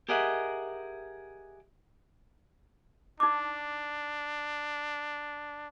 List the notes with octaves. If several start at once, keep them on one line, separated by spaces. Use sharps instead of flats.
G4 G#4 A#4 D#5 E5 F#5
D4 D#4 D6